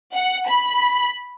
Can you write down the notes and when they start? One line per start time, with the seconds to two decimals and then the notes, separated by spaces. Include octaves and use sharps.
0.14 F#5
0.48 B5